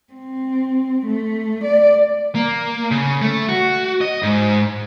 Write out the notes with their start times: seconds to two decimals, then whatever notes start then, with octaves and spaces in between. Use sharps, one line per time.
0.13 C4
1.06 A3
1.64 D5
2.35 A#3
2.91 C#3
3.22 A3
3.49 F#4
4.01 D#5
4.23 G#2